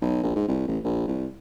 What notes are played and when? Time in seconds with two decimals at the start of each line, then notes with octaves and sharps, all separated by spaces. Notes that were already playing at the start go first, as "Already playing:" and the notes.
0.02 B1
0.23 A#1
0.36 G#2
0.48 C2
0.68 A1
0.84 A#1
1.08 C2